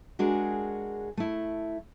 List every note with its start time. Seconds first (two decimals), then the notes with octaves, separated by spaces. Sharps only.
0.19 G#3 D4 F#4 G#4 A#4
1.17 A3 E4